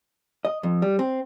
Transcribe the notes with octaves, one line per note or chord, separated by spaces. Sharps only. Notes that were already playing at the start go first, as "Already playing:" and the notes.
D#5
F2
G3
C4